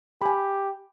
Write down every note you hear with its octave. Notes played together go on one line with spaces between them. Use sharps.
G4 G#5 B5